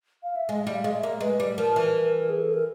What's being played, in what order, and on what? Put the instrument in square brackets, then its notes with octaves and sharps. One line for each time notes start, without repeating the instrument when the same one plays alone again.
[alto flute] F5
E5
[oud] G#3 [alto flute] D#5
[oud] G3
[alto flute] F5
[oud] G#3
[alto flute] E5
[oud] A#3
[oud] G#3 [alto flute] B4
[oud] G3
[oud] F3 [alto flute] A#4
[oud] E3
[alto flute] G#4
A4
A#4